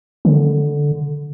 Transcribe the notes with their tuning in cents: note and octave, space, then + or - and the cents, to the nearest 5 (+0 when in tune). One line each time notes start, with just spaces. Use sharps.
D3 -5